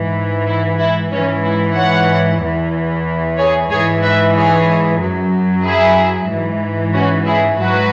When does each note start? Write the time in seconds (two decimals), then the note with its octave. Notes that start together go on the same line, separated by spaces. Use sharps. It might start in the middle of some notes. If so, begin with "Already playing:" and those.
Already playing: G#2 E3
0.47 E4
0.80 E4
1.11 G#2 E3 C#4
1.45 E4
1.76 C#5 F#5
2.41 E2 E3
3.38 G#4 C#5
3.70 G#2 E3 G#4 C#5
4.03 B4 E5
4.35 G#4 C#5
5.00 F#2 F#3
5.64 E4 G#4
6.30 G#2 E3
6.94 C#4 F#4
7.26 E4 G#4
7.59 G#2 F#3 F#4 B4